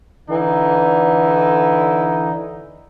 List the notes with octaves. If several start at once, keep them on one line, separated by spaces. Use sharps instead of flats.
D3 E3 D#4